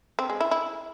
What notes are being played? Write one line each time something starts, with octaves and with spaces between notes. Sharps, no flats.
C4
G#3
E4
E4